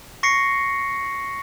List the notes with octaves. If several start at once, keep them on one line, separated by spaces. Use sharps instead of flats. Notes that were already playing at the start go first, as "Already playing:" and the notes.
C#6 A#6 C7 C#7